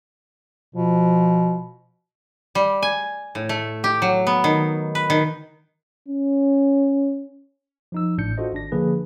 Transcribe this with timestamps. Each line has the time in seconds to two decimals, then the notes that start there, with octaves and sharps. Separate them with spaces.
0.75 B2 F3
2.55 G3
2.82 G#5
3.35 A2
3.49 A3
3.84 G4
4.02 F#3
4.27 B3
4.44 D#3
4.95 B4
5.10 D#3
6.08 C#4
7.92 F3 D#4 E6
8.18 A1 A2 D4 G6 C#7
8.38 D4 F4 F#4 A4 C5 D#5
8.53 G#1 D4 A#6
8.72 D3 F3 A#3 D4 G#4 B4